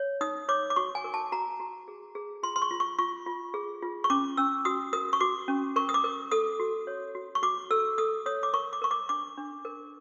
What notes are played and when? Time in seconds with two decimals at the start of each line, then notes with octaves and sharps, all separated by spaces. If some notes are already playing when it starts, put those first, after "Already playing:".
Already playing: C#5
0.21 D#4 D#6
0.49 C#5 D6
0.70 D6
0.76 F#4 C#6
0.95 G#5
1.04 A#4
1.14 A5
1.32 F#4 A#5
1.60 F#4
1.88 G#4
2.15 G#4
2.43 F4 C6
2.56 C6
2.62 C#6
2.71 F4
2.80 C#6
2.99 F4 C#6
3.26 F4
3.54 G#4
3.82 F4
4.04 C#6
4.10 C#4 D6
4.37 C#4 E6
4.65 F#4 D#6
4.93 A#4 D#6
5.13 C#6
5.20 F#4 D6
5.48 C#4
5.76 A#4 C#6
5.89 D#6
5.94 D6
6.04 A#4
6.31 A4 D#6
6.60 F#4
6.87 C#5
7.15 F#4
7.35 C#6
7.43 F#4 D6
7.70 A4 E6
7.98 A4 D#6
8.26 C#5 D#6
8.43 D6
8.54 A#4 C#6
8.73 D6
8.82 A#4 C#6
8.91 D6
9.09 D4 D6
9.37 D4
9.65 A#4